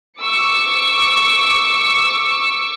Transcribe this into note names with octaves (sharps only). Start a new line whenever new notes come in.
C#6 D6 E6 C#7